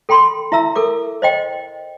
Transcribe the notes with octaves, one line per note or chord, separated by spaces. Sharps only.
A4 G5 B5 C6
E4 E5 A#5 E6
A4 A#4 D6
C5 D#5 G5